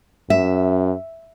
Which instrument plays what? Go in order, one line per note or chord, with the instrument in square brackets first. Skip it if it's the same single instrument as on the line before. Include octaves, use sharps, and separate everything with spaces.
[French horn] F#2 [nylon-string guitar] E5